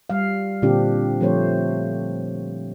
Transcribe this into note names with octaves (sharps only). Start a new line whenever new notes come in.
G3 F5
A#2 D3 C4 D4 G4
F3 A3 C4 C5 C#5